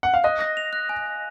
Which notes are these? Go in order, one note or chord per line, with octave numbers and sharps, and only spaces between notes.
F#5
F5
D#5 F#6
A#6
F7
F#6
G#5
G#5